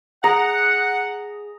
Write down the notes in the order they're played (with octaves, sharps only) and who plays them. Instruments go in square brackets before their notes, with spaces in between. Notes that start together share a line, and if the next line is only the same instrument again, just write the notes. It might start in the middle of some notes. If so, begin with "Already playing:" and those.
[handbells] G#4 D#6 [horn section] F#5 [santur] A#5